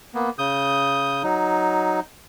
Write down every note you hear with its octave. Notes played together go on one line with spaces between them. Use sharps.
A#3 B3
C#3 D#6 G6
F#3 D#4